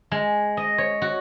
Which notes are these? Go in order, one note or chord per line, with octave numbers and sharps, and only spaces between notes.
G#3
D#5
C#5
F#4